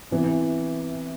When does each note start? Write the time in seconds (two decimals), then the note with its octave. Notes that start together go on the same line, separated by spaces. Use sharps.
0.11 C3 E3 B3